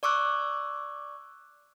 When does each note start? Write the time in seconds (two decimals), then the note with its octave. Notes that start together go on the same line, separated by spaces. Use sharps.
0.03 D5 C#6 D6 E6 F#6